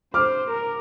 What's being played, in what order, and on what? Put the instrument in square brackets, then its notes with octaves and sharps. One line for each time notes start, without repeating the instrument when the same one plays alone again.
[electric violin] C5 [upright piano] D6 F6
[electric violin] A#4